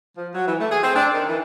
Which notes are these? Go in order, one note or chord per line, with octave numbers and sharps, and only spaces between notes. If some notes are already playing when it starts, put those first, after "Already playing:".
F3
F#3
E3
A3
G#4
C4
D4
D#3
E3